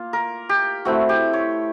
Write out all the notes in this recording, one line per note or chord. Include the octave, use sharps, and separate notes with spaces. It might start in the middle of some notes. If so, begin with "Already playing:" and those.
Already playing: A#3 F4
A#4
G4
A3 C4 E4 F#4
G4
C#5